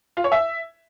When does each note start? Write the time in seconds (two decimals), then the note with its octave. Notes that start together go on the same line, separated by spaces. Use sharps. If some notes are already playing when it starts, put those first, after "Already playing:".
0.17 F4
0.24 C#5
0.32 E5